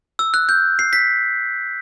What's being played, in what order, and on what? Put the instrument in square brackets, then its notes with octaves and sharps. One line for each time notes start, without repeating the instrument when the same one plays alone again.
[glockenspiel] E6
F#6
G6
C7
B6